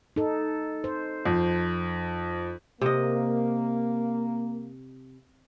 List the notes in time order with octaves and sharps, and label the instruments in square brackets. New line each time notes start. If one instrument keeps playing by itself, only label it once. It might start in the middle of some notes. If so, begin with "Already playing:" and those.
[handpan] D#4 A4
C5
[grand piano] F2
[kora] C3 D#5 [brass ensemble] A#3